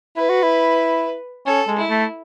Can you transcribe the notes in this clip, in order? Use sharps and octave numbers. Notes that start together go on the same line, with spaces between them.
E4 B4
F#4
E4
C#4 A4
G#3
E4
A3